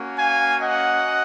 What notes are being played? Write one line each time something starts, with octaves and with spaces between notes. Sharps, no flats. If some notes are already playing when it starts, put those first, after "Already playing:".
Already playing: A#3 C#4 F#4
F5 G#5
D#5 F#5